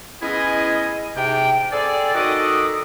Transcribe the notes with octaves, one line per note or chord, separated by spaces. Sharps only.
G#3 B3 C#4 E4 G#4 D#5
G#2 C3 G5
C4 G#4 A4 D5
D#3 F#4 A4 D#5 D6 D#6